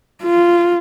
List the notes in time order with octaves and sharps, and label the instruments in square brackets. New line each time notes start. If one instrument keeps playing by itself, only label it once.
[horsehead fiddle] F4